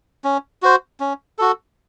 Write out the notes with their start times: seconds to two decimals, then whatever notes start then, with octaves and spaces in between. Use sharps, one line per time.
0.24 C#4
0.62 F#4 C5
1.00 C#4
1.38 F#4 A4